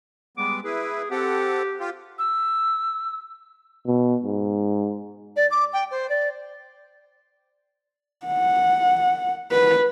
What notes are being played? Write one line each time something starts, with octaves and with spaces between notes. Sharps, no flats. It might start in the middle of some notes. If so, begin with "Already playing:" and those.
G3 G#3 B3 D6
E4 G#4 B4
C4 G4 A4 F#5
F4 G4
E6
B2
G#2
D5
D6
G5
C5
D5
F#5
B4